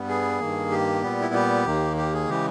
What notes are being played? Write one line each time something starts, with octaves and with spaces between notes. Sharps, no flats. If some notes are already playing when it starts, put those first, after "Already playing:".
Already playing: G2 G3 B3
G#4
G2 D#3 A#3
G4
A#2 G3 B3
E4
G4
D#2 D#3 A#3
G4
G#4
C#3 E3 G#3 G4